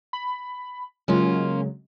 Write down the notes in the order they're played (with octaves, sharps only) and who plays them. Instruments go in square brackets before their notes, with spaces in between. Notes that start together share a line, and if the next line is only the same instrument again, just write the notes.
[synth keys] B5
[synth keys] C#3 F#3 G#3 [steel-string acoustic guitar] A#3 C#4 F4